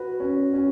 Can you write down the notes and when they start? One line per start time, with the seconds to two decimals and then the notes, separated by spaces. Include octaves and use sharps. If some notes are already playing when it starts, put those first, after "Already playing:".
Already playing: F#4 B4
0.20 C#4
0.54 C#4